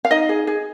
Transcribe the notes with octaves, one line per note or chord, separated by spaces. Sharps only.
F5
D#4 D#5
G#4
G#4